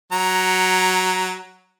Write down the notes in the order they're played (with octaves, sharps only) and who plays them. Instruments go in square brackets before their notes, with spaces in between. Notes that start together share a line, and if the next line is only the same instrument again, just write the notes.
[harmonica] F#3 A#5